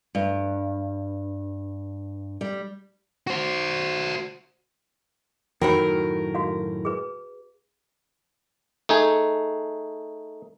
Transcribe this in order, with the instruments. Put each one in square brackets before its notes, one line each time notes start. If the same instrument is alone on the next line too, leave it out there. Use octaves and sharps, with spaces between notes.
[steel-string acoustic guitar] G2
G3
[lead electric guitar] F#4 C5
[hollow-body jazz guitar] F#2 A2 D#3 [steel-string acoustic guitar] A#4 [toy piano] G5 B5
[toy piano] F#4 F5
G#4 B4
[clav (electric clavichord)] A3 D#4 G#4